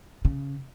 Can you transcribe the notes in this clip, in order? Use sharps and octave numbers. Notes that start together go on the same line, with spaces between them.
C#3